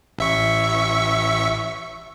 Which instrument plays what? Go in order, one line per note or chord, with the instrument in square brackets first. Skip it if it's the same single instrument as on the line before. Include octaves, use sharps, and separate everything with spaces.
[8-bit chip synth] A1 E5 C#6